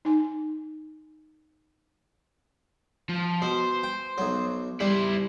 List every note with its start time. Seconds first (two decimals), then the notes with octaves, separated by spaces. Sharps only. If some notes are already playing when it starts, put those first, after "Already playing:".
0.05 D#4 G#5
3.09 F3
3.42 B2 C5
3.83 G5
4.18 B1 F#3
4.80 G3 E4 C5